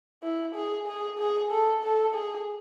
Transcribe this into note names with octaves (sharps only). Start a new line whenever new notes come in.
E4
G#4
G#4
G#4
A4
A4
G#4